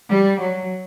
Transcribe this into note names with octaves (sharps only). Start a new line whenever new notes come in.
G3
F#3